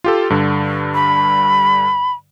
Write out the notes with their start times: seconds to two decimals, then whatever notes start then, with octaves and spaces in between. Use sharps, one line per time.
0.04 F4 G4 A4
0.30 G2 D3
0.94 B5